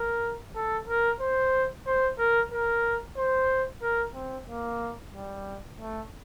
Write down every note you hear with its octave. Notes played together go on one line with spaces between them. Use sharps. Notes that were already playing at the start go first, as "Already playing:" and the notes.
Already playing: A#4
A4
A#4
C5
C5
A#4
A#4
C5
A#4
C4
A#3
G3
A3